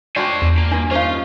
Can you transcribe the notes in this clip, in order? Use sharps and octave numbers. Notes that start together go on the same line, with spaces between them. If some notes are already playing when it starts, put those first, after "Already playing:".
D4 F4 F#4 C5 D5 G5 G#5 C6
E2
A#3
G2 D4 G#5
C#4 D#4 F4 C5 F5